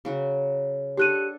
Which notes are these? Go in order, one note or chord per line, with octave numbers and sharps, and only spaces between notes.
C#3 F#3 F#4
D4 G4 A4 F#5 F#6 D#7